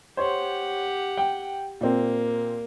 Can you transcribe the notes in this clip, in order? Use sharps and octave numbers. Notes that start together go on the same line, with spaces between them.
G4 C5 C#5 F#5
G5
A#2 A#3 C4